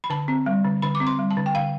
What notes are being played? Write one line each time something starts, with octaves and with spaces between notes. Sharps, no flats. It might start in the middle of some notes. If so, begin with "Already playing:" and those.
B5
D3 A5
C4
G3
D3
D3 B5
D6
C4
C6
G3
A5
D3
G5
D3 F5